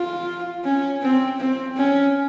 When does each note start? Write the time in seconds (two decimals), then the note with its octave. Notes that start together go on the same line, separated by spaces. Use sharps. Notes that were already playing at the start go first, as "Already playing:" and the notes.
Already playing: F4
0.64 C#4
1.02 C4
1.40 C4
1.77 C#4